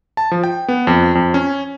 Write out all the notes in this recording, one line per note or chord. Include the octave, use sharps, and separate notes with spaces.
A5
F3
G5
B3
F2
F2
C#4